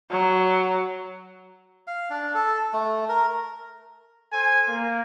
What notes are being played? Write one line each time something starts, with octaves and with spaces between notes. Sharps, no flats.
F#3
F5
D4
A4
A3
A#4
A4 C5 G#5
A#3